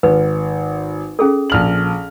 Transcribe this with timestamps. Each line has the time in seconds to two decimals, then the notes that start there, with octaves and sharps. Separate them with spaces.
0.03 G#1 B4
1.19 C#4 G#4 A4
1.50 A#1 F6 F#7